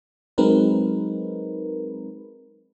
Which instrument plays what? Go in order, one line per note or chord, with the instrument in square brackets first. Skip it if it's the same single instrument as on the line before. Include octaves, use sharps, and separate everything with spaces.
[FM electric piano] F#3 G#3 C4 D#4 A#4 B4